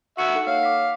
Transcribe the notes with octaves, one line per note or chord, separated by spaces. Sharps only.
F#4 E5 C#7
D#4 A4 F#5
A#3 C#5 F5
D6 B6